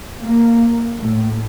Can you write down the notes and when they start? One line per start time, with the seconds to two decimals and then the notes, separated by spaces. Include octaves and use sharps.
0.21 A#3
0.98 A2